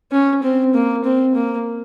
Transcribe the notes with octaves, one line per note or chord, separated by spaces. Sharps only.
C#4
C4
A#3
C4
A#3